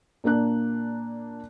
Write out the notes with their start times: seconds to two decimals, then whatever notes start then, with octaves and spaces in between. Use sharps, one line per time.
0.24 A#2 A#3 D4 F#6